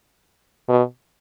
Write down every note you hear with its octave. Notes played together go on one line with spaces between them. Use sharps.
B2